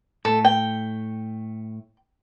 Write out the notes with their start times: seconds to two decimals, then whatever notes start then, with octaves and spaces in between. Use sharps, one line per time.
0.25 A2 A3 A4
0.45 G5